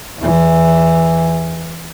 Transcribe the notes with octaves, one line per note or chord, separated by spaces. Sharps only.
E2 E3